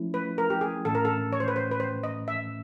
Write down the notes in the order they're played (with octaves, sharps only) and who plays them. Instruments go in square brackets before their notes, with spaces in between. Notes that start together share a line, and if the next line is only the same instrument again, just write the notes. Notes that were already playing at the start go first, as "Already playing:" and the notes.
Already playing: [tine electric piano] F3 A3 C#4 E4
[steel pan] B4
A#4
G4
G#4
[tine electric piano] A2 E3 A3 C#4 [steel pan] A4
[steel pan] A#4
A4
C#5
C5
B4
C5
B4
C5
D#5
E5